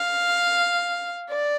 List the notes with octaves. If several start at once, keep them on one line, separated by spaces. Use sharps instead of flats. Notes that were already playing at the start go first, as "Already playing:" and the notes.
Already playing: F5
D5